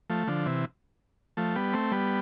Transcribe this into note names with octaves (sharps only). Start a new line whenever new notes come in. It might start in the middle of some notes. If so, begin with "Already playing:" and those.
F3 A3
D3 F3
C3 E3
F3 A3
G3 B3
A3 C4
G3 B3